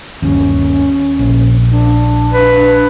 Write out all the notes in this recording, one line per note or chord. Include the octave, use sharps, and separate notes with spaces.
G1 D#2 C#4
A#1
D4
B4